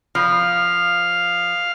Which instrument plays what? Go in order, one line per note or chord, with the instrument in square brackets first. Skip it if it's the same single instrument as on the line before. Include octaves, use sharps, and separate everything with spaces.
[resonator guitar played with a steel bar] F3 [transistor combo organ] F5